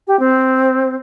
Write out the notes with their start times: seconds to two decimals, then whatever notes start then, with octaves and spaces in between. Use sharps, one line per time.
0.07 G4
0.19 C4